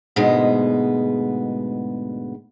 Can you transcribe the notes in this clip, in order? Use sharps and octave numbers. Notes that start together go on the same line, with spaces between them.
D2 G#2 B2 G#3 B3